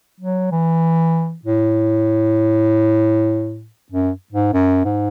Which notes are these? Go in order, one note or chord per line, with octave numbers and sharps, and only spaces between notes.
F#3
E3
A2
F#2
G#2
F#2
G#2